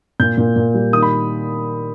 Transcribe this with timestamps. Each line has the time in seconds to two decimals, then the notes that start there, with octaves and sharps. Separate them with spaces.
0.20 A#2 G6
0.38 A#2
0.56 A#2
0.74 G3
0.93 D#3 D#6
1.02 B5